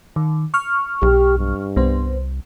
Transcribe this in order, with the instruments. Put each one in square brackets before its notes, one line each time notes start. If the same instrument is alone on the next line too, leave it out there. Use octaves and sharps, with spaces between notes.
[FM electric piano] D#3
C#6 F6
[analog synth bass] B1 [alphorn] G4
[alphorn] G2
[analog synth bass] C2 [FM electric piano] B3 C5